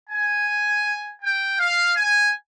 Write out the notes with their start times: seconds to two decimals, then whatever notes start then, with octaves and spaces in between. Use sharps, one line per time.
0.10 G#5
1.22 G5
1.59 F5
1.97 G#5